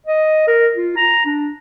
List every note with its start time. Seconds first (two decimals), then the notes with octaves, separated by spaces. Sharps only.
0.07 D#5
0.47 A#4
0.75 F4
0.97 A#5
1.26 D4